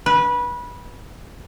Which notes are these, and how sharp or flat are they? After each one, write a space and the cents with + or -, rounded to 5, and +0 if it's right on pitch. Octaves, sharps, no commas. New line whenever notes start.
B4 -20